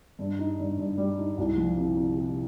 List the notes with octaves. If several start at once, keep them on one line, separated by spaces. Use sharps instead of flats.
G2
D#4
G2
G2
G3
D#4
C2
F3
C3
C3
C3